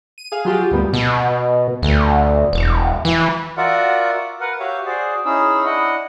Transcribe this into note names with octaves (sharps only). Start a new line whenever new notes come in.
D#7
G#4 F5
F#3 F4 G4 G#4
D2 G2 G3 A#3 B3
B2
D2
E1
E3
F4 F#4 A#4 D5 E5 F#5
A#4 B4 F#5
F#4 G4 C#5 E5 F5
F#4 G#4 C5 D5
C#4 D#4 E4 G#4 E6
D4 E4 D#5 F#5